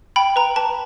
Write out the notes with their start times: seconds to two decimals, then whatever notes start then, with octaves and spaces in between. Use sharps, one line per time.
0.16 G5 B5
0.36 B4 A#5
0.56 B4 A5